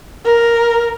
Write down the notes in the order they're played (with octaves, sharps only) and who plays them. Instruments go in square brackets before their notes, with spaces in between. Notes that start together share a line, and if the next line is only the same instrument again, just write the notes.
[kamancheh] A#4